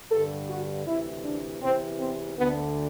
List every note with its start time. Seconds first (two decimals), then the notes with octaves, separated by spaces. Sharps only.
0.11 G2 D3 A4
0.48 F#4
0.86 D2 C3 E3 E4
1.24 D4
1.62 E2 C3 E3 C4
1.99 C4
2.36 D2 D3 B3